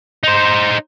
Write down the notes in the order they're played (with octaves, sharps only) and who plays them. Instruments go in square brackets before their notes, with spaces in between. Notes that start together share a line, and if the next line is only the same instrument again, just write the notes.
[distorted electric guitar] D#4 C5